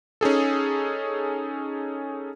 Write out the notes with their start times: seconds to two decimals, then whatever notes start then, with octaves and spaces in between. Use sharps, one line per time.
0.21 C#4 D#4 G#4 A4